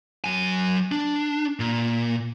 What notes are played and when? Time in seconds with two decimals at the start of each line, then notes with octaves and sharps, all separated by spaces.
0.24 F#3 G#5
0.92 D4
1.60 A#2